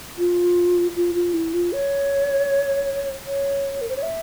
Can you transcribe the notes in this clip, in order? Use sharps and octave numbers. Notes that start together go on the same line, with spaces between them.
F4
F4
F4
E4
F4
C#5
C#5
A#4
C5
C#5
E5